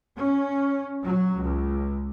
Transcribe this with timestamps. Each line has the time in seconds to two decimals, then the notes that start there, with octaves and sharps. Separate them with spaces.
0.18 C#4
1.02 F#3
1.40 C#2